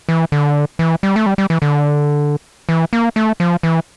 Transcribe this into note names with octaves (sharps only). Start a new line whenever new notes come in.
E3
D3
E3
G3
A3
G3
G3
E3
D3
E3
A#3
A3
F3
E3